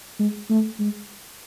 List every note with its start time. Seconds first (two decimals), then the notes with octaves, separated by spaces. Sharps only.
0.19 G#3
0.50 A3
0.79 G#3